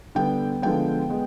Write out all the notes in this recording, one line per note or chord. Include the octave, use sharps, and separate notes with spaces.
D3 G3 B3 G5
D3 F3 G#3 B3 G5
G#3 B3